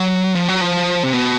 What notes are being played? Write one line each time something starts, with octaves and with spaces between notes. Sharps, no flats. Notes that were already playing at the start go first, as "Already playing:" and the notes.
Already playing: F#3
F3
F#3
F3
C3
B2